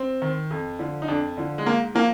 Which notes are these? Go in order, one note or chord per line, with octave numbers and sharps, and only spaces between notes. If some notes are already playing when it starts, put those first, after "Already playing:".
Already playing: C4
D#3
F2
D3 F3
D#4
F2 D4
D3 F3
G#3
G#2 A#3
F3 A#3